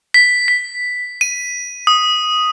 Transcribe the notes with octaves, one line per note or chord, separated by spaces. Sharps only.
B6
B6
D#7
D#6